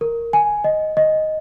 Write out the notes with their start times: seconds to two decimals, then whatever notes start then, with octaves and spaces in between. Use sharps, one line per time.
0.01 A#4
0.33 G#5
0.64 D#5
0.97 D#5